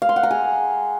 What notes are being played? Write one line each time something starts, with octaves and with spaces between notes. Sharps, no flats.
F5
C6
F#5
A#5
G#4